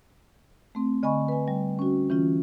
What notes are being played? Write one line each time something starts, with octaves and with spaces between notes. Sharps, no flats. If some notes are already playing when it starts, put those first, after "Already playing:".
A3 C4
D3 D#5 G#5 B5 C#6
B4 G#5
G3
C#4 F#4
E3 C#4 F4